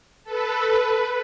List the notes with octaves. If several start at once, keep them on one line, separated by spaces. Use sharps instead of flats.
A4 B4
B4